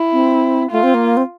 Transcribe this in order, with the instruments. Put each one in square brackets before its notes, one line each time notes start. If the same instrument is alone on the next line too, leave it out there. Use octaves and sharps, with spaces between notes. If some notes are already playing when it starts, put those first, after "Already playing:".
Already playing: [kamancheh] E4
[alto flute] C4
[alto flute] A3 [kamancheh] F4
[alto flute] C4
A#3
C4